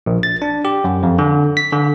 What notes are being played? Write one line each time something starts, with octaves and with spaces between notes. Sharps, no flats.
A#1
A6
D4
G4
F#2
F2
D3
B6
D3